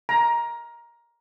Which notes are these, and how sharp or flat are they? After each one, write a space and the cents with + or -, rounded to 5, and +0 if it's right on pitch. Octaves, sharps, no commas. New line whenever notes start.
A#5 +15